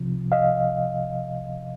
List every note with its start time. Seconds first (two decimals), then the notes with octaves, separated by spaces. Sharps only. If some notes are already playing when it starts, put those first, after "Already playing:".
Already playing: C2 C3 F3
0.32 D#5 F5